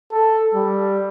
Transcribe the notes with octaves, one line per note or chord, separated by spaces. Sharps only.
A4
G3